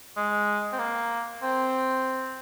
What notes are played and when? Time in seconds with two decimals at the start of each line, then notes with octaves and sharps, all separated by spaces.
0.17 G#3
0.72 C4
0.79 A#3
1.43 C4